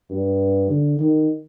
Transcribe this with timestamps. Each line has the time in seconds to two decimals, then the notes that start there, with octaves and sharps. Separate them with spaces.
0.10 G2
0.70 D3
0.99 D#3